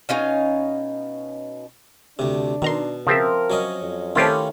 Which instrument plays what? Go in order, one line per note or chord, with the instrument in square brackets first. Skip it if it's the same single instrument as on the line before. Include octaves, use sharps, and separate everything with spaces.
[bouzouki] B2 C#4 D#4 F5
[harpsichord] D2 C3 [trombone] D4
[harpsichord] B2 [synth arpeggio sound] D#3 A#5 C6
[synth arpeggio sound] C#3 [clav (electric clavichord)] F3 C4 E5 [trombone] A#4
[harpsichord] F#3 C#4 D#5
[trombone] F2
[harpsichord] D#3 A3 C#4 [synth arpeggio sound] C4 A4 [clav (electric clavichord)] E4 F4 G4